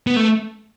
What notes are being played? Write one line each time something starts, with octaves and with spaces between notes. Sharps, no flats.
B3
A3